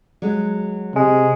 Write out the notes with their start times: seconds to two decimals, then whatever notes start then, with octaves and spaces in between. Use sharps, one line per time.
0.22 F#3 G#3
0.96 C3 G#3